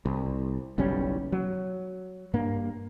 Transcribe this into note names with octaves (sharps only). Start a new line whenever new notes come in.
C2
F#1 B1 G3 C#4
F#3
G2 A#3